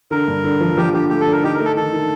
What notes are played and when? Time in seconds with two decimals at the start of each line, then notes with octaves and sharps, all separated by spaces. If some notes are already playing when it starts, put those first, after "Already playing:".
0.11 D3 A#4
0.28 G2
0.44 D3
0.60 F3
0.77 F3 G4
0.94 D3 G4
1.09 A3 G4
1.21 A4
1.26 D3
1.32 A#4
1.43 D#4 G4
1.55 A3 A#4
1.65 A4
1.76 D#3 A4
1.93 D#3